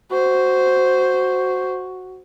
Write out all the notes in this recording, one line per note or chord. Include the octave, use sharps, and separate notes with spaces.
F#4 C5